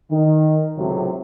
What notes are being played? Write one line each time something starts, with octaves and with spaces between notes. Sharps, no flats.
D#3
C#2 A2 C3 F#3